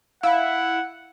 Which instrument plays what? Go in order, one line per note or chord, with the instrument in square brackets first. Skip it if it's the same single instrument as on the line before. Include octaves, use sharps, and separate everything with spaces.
[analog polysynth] E4 [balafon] F5 [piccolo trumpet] F#5